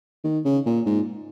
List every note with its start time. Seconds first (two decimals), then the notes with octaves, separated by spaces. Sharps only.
0.24 D#3
0.45 C#3
0.66 A#2
0.86 G#2